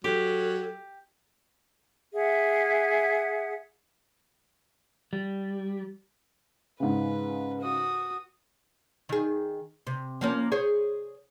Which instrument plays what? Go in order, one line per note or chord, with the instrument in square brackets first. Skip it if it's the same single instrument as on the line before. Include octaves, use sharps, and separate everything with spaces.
[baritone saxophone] F#3 [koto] G4 [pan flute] A4
[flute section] G#4 E5 F#5
[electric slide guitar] G3
[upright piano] G#2 C#3 [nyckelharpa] B4
[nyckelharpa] F#4 D#6
[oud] D#3 G#4
C3
F3 A#3 C#4
G#4 C5 C#5